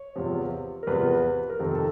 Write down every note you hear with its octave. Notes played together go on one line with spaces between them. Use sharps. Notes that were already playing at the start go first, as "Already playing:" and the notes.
Already playing: C#5
E2 C3 F3
A#4
E2 C3 F3 B4
A#4
F2 C3 D#3 A4
A4